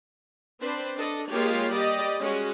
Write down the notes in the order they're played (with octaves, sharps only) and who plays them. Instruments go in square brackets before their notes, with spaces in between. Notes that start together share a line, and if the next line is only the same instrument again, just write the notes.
[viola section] C4 D4 B4 C5
D4 A4 D#5
G#3 A#3 F4 G4 C#5
G3 G4 D5 D#5
G#3 C#4 F#4